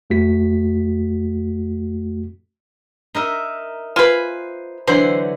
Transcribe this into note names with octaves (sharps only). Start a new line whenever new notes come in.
F2 A3 F#4 B6
D#4 A#4 E5
F4 B4 C5 G#5
D3 E3 F#3 C5